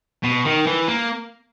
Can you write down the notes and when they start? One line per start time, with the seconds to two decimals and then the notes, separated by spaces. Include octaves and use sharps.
0.23 B2
0.45 D#3
0.66 E3
0.88 A#3